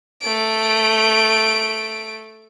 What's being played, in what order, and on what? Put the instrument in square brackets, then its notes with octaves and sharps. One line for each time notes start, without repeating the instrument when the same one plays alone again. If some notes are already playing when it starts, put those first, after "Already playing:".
[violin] A3 D7